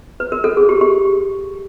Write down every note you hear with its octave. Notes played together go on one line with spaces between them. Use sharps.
B4
A#4
A4
G#4
G4
G4